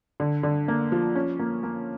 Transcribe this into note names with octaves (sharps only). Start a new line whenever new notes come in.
D3
D3
A#3
F3
C#4
A#3
A#3